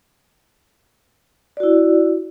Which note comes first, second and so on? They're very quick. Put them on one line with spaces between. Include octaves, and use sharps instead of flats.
D5 F#4 E4